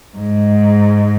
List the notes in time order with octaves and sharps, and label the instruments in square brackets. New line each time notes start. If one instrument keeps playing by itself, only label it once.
[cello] G#2